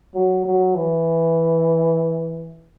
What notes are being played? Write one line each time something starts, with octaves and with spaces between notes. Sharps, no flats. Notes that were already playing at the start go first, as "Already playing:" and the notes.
F#3
F#3
E3